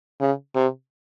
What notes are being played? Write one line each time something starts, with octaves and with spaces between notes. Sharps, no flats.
C#3
C3